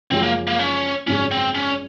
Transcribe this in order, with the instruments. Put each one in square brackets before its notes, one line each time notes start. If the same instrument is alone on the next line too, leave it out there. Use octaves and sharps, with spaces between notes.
[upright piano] F#1 F#2 F3 G#3 [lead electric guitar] C4
[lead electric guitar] A#3
A#3
C#4
[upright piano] G#1 F#2 C#3 F3 G#3 [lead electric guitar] C#4
[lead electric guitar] C4
C#4